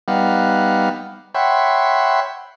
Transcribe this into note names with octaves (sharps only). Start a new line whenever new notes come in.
G3 B3 D#4 F5 F#5
C#5 E5 F#5 G5 B5 C6